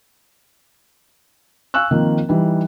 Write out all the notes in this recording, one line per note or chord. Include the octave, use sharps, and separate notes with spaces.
F5 G#5 C#6 E6 F#6
D#3 F3 A#3 C4
E3 G3 D#4